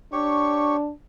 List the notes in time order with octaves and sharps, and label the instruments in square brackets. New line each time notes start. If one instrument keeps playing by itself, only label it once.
[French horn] D4 [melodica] G4 C#5 C#6